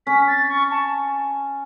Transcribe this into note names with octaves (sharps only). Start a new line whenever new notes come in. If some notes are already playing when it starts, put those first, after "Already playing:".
C#4 B6
A6
C#6
A5